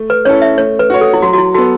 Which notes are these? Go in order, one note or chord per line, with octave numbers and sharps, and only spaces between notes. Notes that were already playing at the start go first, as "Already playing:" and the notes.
Already playing: A3
B4
C#4 E4 A4 C#5
E5
A3 C#5
B4
F#4 C#5
A4
E4
F#3 F#4
F#4
E4
B3 F#4 A4